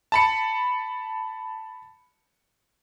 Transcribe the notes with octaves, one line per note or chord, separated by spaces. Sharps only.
A5 B5 C#7